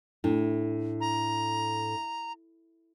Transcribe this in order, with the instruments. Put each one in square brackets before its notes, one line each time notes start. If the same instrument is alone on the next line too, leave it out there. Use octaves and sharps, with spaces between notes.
[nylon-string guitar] A2 [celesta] D4 E4
[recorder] A#5